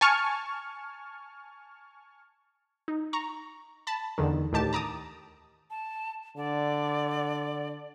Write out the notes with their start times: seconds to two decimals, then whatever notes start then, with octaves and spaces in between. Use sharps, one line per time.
0.01 G#5 A5 C#6 F6
2.88 D#4
3.13 A#5 C#6
3.87 A5 B5
4.18 E2 D3 D#3
4.52 D2 A2 D#3 G4 A5
4.73 A5 A#5 D6 D#6
5.70 A5
6.37 D3 D5